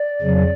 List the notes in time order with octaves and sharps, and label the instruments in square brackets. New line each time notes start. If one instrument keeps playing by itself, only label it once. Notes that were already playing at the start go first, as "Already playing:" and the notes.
Already playing: [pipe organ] D5
F2 C#3 F#3